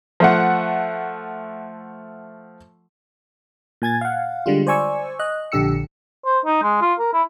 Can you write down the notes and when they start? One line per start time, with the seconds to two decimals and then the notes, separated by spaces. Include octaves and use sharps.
0.20 F3 A3 F#5
3.82 A#2 G#5 G#6 A6
4.01 F5 F#5
4.46 D3 G3 G#3 F4
4.67 C5 D5 G#5 C#6 E6
5.19 D#5 F#6
5.52 A#1 D3 G4 E6 C#7
6.25 C5
6.45 D#4
6.63 G#3
6.81 F4
6.99 A#4
7.13 E4